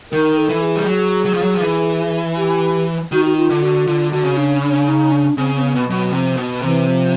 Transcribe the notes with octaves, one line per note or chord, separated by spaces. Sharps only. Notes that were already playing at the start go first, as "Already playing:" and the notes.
D#3 A#4
A4
E3
G#4
G3
F#3
F#3
F3
F#3
F3
E3
G4
D#3 F#4
F#4
F4
D3
F#4
D3 F4
D3 F#4
C#3
D4
D4
D#4
D4
C#3 C4
C4
B3
B2
B2 F#3
C3 F3
B2
C3 E3
F3